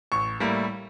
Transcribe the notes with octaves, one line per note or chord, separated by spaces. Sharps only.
A1 C#6
A2 G3 A#3 E4